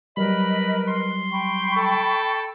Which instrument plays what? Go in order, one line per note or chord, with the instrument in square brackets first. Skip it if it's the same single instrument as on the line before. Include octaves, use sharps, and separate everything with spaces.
[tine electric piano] F#3 G3 [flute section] A#4 B4 D#5 [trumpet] B5
[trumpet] C6
[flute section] G5 B5 C#6
[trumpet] A4